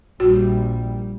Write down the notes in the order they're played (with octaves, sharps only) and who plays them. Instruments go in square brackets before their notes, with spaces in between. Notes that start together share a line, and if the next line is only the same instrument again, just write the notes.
[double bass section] A#1 G3 [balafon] F#4